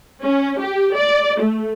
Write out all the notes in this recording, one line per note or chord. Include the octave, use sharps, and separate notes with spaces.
C#4
G4
D5
A3